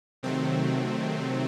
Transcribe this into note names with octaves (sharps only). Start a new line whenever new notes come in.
C3 D#3 F#3 A3 C4